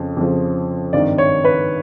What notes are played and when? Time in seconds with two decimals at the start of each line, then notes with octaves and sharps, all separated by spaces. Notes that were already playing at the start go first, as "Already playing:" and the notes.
Already playing: F2 C#3 F3
0.17 F2 C#3 F3
0.93 G#1 G2 D#3 D5
1.18 C#5
1.45 B4